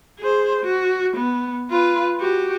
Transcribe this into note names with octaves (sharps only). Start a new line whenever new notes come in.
G#4 C5
F#4
B3
F4 B4
F#4 G4